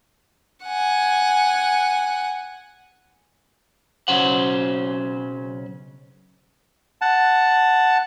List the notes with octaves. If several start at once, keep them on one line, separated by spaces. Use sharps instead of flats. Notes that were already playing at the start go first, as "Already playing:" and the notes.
F#5 G#5
B1 C#3 F#3 C#4 C5 F#5
F#5 A5